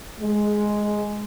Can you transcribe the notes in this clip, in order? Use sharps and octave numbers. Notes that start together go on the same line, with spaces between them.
G#3